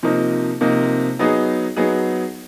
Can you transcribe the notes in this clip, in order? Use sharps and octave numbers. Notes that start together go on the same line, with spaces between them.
C3 F3 A#3 D#4
C3 F3 A#3 D#4
F#3 B3 D#4 G#4
F#3 B3 D#4 G#4